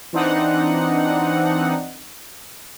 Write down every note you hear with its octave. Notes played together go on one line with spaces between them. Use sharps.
E3 C4 D4 D#4 F#5